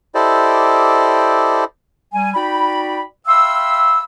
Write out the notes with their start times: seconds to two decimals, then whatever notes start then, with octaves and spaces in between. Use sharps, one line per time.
0.15 E4 G4 A4 C5 D5 D#5
2.14 G3 G#5
2.34 D#4 F#4 D5 G5 B5
3.27 E5 F5 G5 B5 C6 E6